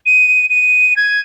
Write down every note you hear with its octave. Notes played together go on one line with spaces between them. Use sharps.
D#7
D#7
G#6